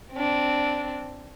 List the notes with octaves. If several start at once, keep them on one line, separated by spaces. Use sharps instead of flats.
C4 D4